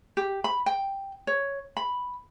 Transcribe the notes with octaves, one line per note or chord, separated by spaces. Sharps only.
G4
B5
G5
C#5
B5